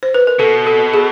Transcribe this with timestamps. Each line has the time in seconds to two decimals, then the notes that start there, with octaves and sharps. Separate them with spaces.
0.03 C5
0.14 B4
0.27 A#4
0.39 B2 A4
0.67 A4
0.94 G#4